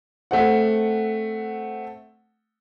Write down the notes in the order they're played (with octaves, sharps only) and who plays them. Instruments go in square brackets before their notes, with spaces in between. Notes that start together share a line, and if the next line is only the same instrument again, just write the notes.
[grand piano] A3 C4 F#5